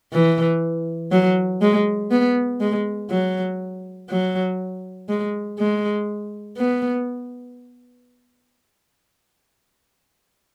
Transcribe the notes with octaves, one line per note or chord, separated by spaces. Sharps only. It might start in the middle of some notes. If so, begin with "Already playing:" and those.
E3
F#3
G#3
B3
G#3
F#3
F#3
G#3
G#3
B3